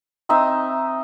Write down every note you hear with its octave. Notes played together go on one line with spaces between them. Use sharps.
C4 D#4 D#5 E5